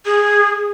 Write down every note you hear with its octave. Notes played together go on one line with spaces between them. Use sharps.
G#4